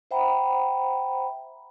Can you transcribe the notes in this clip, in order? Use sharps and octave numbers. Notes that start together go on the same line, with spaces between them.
C5 E5 F#5 G5 A#5 B5